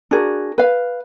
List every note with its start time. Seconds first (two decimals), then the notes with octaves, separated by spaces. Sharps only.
0.11 D4 F#4 G#4 A#4
0.58 B4 F5